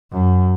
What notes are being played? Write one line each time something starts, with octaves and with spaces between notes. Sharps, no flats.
F#2